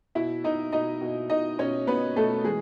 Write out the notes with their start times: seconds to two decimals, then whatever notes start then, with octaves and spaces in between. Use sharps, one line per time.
0.15 B2 E4 E5
0.44 B2 D#4 D#5
0.72 B2 D#4 D#5
1.01 B2
1.30 B2 D#4 D#5
1.58 B2 C#4 C#5
1.87 B2 B3 B4
2.16 B2 A3 A4
2.44 E3 G#3 G#4